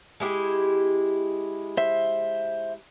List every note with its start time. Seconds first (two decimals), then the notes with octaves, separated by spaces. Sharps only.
0.20 G#3 E4 G4
1.77 C5 E5